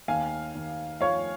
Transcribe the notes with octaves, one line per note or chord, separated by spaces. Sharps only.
D#2 F5 G#5
D#2
F3 C#5 F5